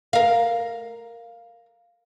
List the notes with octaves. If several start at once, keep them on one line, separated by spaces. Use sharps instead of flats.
A#4 F5